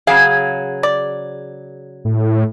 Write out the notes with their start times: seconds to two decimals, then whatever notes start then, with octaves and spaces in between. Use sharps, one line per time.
0.07 C#3 F#3 G#4 F5
0.83 D5
2.05 A2